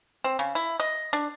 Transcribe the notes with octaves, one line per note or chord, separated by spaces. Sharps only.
C4
C#3
E4
D#5
D4